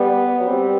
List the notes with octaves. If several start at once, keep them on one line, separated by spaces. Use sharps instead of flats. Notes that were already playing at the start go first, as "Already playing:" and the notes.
Already playing: G3 B3
F#3
G3 C4